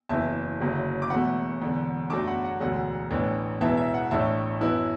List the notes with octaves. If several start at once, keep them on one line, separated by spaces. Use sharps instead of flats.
F#1 E2 E3 E5 A5
F#1 F#2 D3 F#3
D6
E1 E2 B2 A3 F#5 B5
E1 E2 D3
F#2 F#3 A3 D4 A5 D6
F#5 B5
F#5
E1 D2 D3 F#3 F#5
A1 A2 E3 D4
E1 E2 E3 B3 E5 A5
E5
F#5
A1 A2 A3 D4 E5 A5
F#2 E3 B3 E4